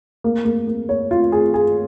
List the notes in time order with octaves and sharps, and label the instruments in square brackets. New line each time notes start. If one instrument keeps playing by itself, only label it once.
[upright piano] A#3
A#3
A#3
C#5
F4
G#4
G#4